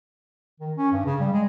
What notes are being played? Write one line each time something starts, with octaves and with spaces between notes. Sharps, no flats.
D#3
C#4
G2
C#3
G3
G#3